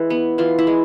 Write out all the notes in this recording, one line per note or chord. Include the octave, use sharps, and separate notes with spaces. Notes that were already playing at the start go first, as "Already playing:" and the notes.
Already playing: E3 G#3
B3
E3 F4
E4
G#3